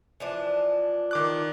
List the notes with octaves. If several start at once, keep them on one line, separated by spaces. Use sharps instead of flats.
E3 F3 D4
D#3 D6 F#6